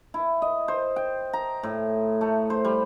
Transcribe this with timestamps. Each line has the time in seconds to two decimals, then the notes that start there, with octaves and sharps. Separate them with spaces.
0.14 E4
0.42 D#5
0.68 C5
0.96 G5
1.33 A#5
1.63 A2
2.21 A3
2.50 C5
2.65 G3